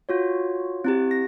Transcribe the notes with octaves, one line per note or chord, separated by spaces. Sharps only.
F4 F#4 C#5
C4 E4 G4
A#6